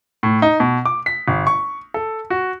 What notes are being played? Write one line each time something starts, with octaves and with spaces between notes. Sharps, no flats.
A2
D#4
B2
D6
B6
G1
C#6
A4
F#4